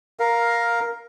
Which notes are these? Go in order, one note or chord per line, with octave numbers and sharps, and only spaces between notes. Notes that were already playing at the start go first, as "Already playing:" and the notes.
A#4 F5